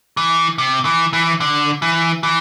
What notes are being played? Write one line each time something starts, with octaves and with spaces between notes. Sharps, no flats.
E3
C3
E3
E3
D3
E3
E3